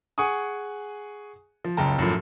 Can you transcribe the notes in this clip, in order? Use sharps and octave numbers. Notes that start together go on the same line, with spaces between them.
G#4 F#5 G#5 C#6 D#6
F3
F#1 C#2 G5 A5 A#5
F#2 A2 F3